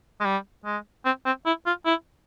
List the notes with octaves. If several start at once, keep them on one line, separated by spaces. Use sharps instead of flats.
G#3
G3
G#3
C4
C4
E4
F4
E4